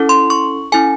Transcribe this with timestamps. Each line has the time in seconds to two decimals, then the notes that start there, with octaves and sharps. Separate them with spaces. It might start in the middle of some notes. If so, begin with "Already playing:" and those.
Already playing: C#4 E4 A4
0.09 C6
0.30 C#6
0.72 C#4 E4 A4 G#5